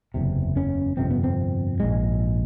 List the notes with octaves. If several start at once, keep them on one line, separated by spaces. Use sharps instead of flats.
F#1 E2 C3
C#4
G1 F2 C3 C4
B3
C4
A#1 G#2 G#3